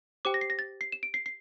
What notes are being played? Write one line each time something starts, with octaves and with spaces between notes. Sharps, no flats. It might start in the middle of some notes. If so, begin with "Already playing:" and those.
G4 C5 G5 D6
A#6
C7
A#6
A6
C7
E7
D7
C7
C7